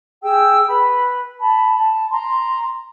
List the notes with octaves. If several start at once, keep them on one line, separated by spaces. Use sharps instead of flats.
G4 G#4 G5 E6
B4 B5
A5 B5
A5
A#5 C6